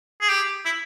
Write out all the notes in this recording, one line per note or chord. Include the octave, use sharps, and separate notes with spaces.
G#4
G4
E4